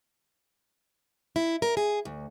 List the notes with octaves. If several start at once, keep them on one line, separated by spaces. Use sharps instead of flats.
E4
A#4
G#4
D2